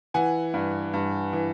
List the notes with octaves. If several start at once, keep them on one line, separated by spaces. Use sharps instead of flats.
E3 F#5 G#5
G2
G2
E3